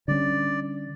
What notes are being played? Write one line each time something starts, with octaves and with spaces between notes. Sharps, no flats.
D3 G3 C#4 D5